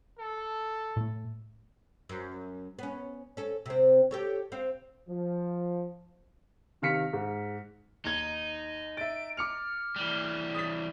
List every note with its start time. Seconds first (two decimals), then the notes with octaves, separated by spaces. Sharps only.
0.19 A4
0.97 A2 A3
2.09 F#2
2.79 B3 C#4
3.37 C#4 A4
3.66 C3 C4
4.11 G4 A4 C#5
4.52 C4 F5
5.09 F3
6.82 C3 D#3 F5 F6 B6 C#7
7.13 G#2
8.05 D#2 D#4 G#6 G7
8.97 E5 A6 D7
9.37 D6 F6 C#7 F7
9.96 E3 G3
10.55 D#6 A6 B6